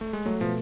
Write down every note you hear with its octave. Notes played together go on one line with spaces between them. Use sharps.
A3
G#3
F#3 A3
B2 F3